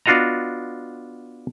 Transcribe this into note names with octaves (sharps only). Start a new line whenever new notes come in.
B3 D4 F4 F#4 D#5 A#5